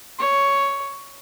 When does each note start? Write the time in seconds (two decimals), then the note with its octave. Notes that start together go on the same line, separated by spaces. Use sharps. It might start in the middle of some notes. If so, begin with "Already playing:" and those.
0.19 C#5